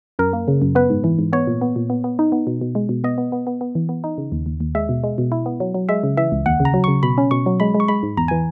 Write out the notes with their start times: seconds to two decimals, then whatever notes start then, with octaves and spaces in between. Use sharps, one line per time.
0.19 F#2 A#4
0.33 A#3
0.48 C#3
0.62 F#2
0.75 B3 B4
0.90 G#2
1.04 E3
1.19 G#2
1.33 B3 C#5
1.47 A#2
1.61 B3
1.76 A#2
1.90 B3
2.04 B3
2.19 D#4
2.32 B3
2.47 B2
2.61 B2
2.75 G#3
2.89 B2
3.04 B3 D#5
3.18 B3
3.32 B3
3.47 B3
3.61 B3
3.75 E3
3.89 B3
4.04 D#4
4.18 C#3
4.32 D#2
4.46 D#2
4.60 D#2
4.75 G#3 E5
4.89 B2
5.04 G#3
5.18 B2
5.32 E4
5.46 B3
5.60 F#3
5.74 F#3
5.89 G#3 E5
6.03 C#3
6.17 E3 E5
6.32 C#2
6.46 D#2 F#5
6.60 C#3
6.65 A#5
6.74 F#3
6.84 C#3 C#6
7.03 B2 B5
7.18 C#4
7.31 B2 C#6
7.46 F#3
7.60 G#3 B5
7.74 G#3
7.80 C#6
7.88 G#3 B5
8.03 G#2
8.17 E2 A#5
8.28 E3 G#5